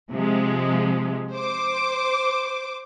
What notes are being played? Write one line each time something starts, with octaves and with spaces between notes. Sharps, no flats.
C3 F3 G#3
C5 D6